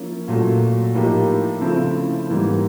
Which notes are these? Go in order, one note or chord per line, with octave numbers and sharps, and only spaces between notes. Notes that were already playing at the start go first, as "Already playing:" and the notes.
Already playing: F3 A#3 C#4 E4
A#2 F#3 A3
A2 F3 A#3 D#4 G4
C#3 F3 A3 C4 E4
G#2 E3 G3 A#3